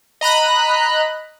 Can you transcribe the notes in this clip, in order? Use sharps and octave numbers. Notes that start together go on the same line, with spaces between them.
D#5 A#5 B5 F#6